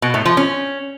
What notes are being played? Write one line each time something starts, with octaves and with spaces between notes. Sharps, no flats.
B2
A2
F3
C#4